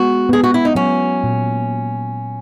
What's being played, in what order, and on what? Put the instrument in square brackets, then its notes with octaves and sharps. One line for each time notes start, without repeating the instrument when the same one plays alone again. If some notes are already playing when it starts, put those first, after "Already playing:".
Already playing: [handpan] G#3 B3 [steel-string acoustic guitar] F#4
[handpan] B3 [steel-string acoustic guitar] G#4
[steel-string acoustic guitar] F#4
E4
D#4
[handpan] F#3 [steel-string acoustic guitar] C#4
[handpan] A#2